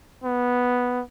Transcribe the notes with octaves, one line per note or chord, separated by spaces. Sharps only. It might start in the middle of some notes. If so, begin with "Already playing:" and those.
B3